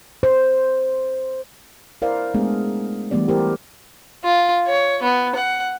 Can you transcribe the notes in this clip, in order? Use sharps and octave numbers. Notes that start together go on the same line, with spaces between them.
C5
E4 A#4 C5 D5 F5
G#3 A3 B3 D4 G#4
E3 G3 A3 B3 G4 D5
E4 G4 A4 A#4 C5
F4
C#5
B3
F#5